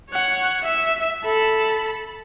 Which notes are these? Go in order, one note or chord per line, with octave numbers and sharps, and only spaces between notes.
C#5 F#5
E5
A4 B5